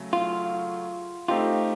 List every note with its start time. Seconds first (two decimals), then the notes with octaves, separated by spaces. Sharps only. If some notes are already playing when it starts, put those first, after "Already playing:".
Already playing: C#3 F#3 A3
0.13 F4
1.28 A3 C4 D#4 F4 G4